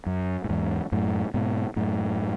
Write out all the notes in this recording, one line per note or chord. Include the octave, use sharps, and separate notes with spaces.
F#2
A2
E2 G#2
F#2 A2
G#2 B2
F#2 A2